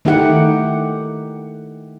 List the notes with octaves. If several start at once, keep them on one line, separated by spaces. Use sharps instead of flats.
D#3 A3 D#4 E4 G4 F#5